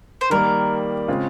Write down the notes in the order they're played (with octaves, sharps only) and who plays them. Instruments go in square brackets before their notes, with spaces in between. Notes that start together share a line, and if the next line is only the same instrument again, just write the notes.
[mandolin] C5
[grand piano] D#3 G3 A#3 [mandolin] A#4
[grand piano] C#3 G#3 C4 F4